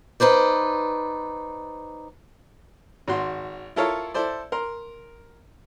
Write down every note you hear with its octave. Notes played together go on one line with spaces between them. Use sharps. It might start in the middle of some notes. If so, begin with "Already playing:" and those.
D#4 B4 C5 D5
G#1 F#4 C6
E4 F4 A4 A#4 C#5 F5
E4 A4 C5 D5
A#4 C6